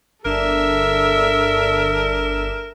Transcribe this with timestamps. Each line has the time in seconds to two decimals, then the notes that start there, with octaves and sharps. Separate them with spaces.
0.25 G1 D4 A4 A#4 E5 E7